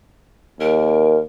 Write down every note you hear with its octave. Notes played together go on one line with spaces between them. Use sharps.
D#2 A#4